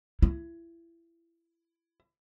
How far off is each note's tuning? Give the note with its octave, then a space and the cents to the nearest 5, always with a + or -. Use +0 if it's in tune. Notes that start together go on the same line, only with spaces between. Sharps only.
E4 +25